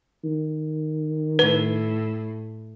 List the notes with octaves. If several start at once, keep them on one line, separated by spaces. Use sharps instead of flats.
D#3
A2 B4